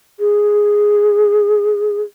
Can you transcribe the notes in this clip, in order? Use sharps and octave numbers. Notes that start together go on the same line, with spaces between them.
G#4